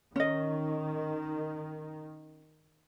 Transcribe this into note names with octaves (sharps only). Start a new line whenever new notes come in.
D#3 C#4 D#5